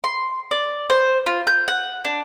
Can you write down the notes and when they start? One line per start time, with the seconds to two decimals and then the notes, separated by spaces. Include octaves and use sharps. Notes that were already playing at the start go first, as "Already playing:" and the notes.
0.04 C6
0.51 D5
0.90 C5
1.26 F4
1.47 G6
1.68 F#5
2.05 D4